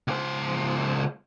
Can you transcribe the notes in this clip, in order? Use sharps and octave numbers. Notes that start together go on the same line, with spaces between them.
C#2 C5